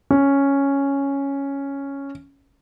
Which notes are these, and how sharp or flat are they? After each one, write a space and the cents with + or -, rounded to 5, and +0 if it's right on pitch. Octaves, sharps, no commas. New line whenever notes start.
C#4 +0